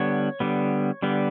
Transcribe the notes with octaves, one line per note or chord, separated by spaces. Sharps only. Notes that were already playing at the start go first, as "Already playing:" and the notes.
Already playing: D3 G3 B3 C#5
D3 G3 B3
D3 G3 B3